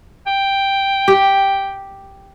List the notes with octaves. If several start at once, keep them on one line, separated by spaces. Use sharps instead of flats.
G5
G4